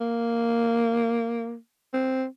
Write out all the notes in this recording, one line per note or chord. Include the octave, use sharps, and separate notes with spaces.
A#3
C4